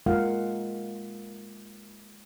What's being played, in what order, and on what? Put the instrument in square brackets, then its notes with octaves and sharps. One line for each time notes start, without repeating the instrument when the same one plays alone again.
[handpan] G#3 A#3 F4 A#4 F5 F#5